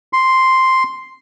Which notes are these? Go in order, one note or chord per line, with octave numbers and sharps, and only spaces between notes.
C6